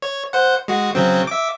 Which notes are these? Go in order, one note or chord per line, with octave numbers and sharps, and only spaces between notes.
C#5
C5 F#5
G#3 F#4
C#3 F#3 C4
E5 D6